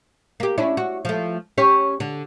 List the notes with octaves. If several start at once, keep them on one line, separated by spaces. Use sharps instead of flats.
A#3 G4
C#4 D4 E4
F#4
F3 A3
C#4 G4 C#5
D3